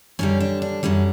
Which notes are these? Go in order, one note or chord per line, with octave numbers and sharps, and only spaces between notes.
F#2 D3 G3 C#4
D4
D4
F#2 D3 G3 C#4